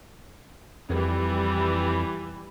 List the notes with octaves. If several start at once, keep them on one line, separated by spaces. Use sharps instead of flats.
F2 E3 G3